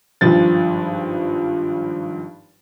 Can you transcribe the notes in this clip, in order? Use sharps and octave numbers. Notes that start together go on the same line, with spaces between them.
G#1 G2 F3 A6